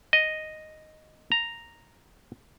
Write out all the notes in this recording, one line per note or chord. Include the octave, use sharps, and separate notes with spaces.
D#5
A#5